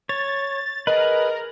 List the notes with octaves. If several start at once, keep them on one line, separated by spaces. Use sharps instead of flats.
C#5 A6
G#4 A#4 B4 D#5